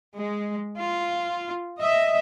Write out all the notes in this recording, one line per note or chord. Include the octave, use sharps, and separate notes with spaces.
G#3
F4
D#5 E5